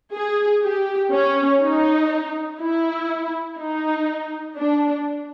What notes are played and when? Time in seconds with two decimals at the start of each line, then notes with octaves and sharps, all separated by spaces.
0.14 G#4
0.62 G4
1.12 C#4
1.62 D#4
2.60 E4
3.58 D#4
4.57 D4